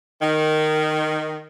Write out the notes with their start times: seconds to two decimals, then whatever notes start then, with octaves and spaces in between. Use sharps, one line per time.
0.21 D#3